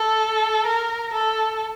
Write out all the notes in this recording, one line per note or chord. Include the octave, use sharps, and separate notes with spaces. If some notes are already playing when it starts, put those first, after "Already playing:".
Already playing: A4
A#4
A4